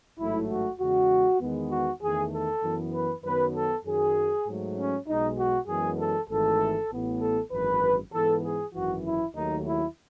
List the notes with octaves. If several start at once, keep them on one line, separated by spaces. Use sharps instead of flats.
A1 G#2 F#3 A3 E4
F#4
E2 C#3 G#3 F#4
E2 D#3 G#3 B3
F#4
E2 D#3 A3 G#4
A4
F#2 E3 B3
B4
F#2 D#3 F#3 B3 B4
A4
F#2 D#3 F#3 G#4
G#2 F#3 A3
C#4
B1 B2 G#3 D#4
F#4
F#2 E3 G#3 B3 G#4
A4
G#1 G#2 E3 A3 A4
A1 A2 E3 B3
A4
G#1 F#2 E3 B4
G#2 E3 B3 A4
G#4
G#1 F#2 E3 F#4
E4
D#2 D#3 F#3 A3 D#4
E4